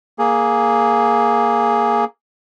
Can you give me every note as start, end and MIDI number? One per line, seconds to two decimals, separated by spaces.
0.19 2.05 58
0.19 2.05 68